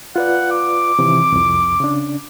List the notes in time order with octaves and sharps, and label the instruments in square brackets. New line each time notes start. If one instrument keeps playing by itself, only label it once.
[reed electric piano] F4 B4 D5 [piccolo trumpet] F#5
[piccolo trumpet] D6
[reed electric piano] C3 D#3 E3
C2 F2
C#3 D4